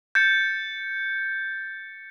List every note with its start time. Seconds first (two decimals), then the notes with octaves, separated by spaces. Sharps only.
0.15 G6 A6 C#7